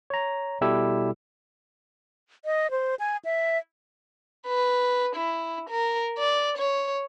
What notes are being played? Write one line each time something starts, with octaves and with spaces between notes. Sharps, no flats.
C#5 A#5
B2 G3 E4 G4 A4 E6
D#5
C5
G#5
E5
B4
E4
A#4
D5
C#5